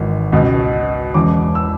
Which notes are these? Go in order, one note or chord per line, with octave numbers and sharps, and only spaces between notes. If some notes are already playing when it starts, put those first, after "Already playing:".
Already playing: G#1 G#2 E3
C#2 B2
E1 E2 C#3 E3 D6
E6